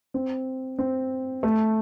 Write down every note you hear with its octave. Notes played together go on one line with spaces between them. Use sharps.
C4
C4
A3